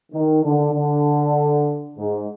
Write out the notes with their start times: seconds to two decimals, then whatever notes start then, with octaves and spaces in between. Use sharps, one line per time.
0.13 D#3
0.44 D3
0.74 D3
1.98 G#2